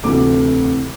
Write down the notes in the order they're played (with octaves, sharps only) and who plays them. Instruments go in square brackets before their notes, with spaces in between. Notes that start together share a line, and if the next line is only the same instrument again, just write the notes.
[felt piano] D2 C3 E3 A3 D6